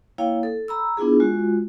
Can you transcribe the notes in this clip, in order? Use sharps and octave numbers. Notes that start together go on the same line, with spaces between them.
A#3 E4 C#5 F5 G5
A4
A#5 B5 E6
B3 D4 E4 F4 G#4
G#3 F4 F#4